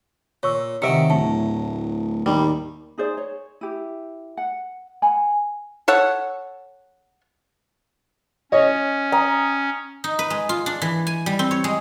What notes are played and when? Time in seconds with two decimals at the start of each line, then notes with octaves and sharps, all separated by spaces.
0.43 A#2 C#5 C#6 E6
0.82 C3 D#3 F#3 E5 C#7 D7
1.10 D1 A2 A5
2.26 D#2 G3
2.98 D#4 G#4 C5 D5
3.17 C#5
3.61 E4 G4
4.37 F#5
5.02 F#5 G#5 B5
5.88 A4 C#5 F#5
8.52 C#4 C#5 D#5
9.12 A#5 D#6
10.04 D#4
10.19 B4
10.30 G#3
10.49 F4
10.66 D4
10.82 E3
11.07 G#5
11.26 G3
11.39 C4
11.51 C#5
11.64 G#3